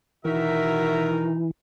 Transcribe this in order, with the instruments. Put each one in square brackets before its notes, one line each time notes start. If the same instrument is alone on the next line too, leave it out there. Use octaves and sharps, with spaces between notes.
[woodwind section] B2 D#3 D#4 [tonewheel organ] E3 [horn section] F#4 E5 [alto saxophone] A#4